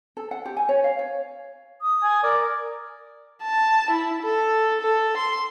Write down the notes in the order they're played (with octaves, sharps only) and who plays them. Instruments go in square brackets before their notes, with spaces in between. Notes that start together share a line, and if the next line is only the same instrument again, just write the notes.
[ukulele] A4
F#5
G4
G#5
C#5
F5
C#5
[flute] D#6
[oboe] G#5
[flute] A#4 [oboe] D5
[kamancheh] A5
E4
A4
A4
C6